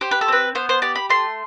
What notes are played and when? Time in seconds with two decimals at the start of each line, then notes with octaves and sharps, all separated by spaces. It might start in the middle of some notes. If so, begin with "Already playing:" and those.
0.01 G4 C5
0.11 B4
0.21 A4
0.28 C4 B4
0.55 B3 C5
0.69 C5
0.82 G4 D5
0.96 B5
1.10 A3 C6